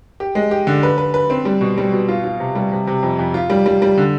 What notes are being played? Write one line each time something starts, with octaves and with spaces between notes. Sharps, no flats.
G4
G#3
G4
D3
B4
B4
B4
C4
G3
B2
G3
B2
F4
F4
C3
G3
C3
C3
F2
F2
F4
G3
G3
G3
D3